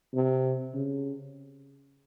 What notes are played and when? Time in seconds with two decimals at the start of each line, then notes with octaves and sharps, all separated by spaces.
0.14 C3
0.74 C#3